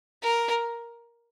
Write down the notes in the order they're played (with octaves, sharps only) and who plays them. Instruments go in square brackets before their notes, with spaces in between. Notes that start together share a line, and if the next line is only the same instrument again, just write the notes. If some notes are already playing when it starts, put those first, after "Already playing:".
[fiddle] A#4